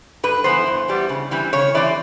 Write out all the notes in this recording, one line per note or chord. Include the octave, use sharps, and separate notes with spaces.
G2 B4
E3 G3 B3 C5
G2
E3 G3 B3
C#3
E3 G3 C4
C#3 C#5
E3 G3 C4 D5